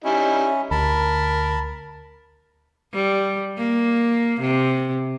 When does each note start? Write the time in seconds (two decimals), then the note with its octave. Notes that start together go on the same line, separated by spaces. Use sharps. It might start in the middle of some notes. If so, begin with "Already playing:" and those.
0.04 G3 C#4 D#4 E4
0.71 D2 A#4 A5 B5
2.94 G3
3.58 A#3
4.41 C3